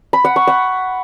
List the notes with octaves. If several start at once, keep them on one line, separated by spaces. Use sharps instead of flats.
B5
F#5
C#6
F#5